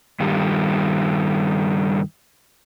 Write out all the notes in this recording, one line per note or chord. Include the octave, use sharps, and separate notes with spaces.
G2 D#3 G3